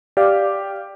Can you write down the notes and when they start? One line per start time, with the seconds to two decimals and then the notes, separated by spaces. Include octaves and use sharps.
0.17 G4 D5 F5